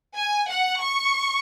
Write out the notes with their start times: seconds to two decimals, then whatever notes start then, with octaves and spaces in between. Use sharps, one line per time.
0.15 G#5
0.48 F#5
0.81 C#6